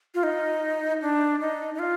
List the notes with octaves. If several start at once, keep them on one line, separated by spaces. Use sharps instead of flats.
F4
D#4
D4
D#4
D#4
F4